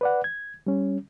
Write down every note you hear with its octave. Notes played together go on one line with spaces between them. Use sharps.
B4 D5 F#5
G#6
G3 C#4